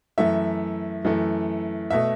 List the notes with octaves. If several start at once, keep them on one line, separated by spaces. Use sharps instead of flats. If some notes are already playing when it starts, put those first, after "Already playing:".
F#2 E3 A3 E5
F#2 E3 A3
B2 A3 E5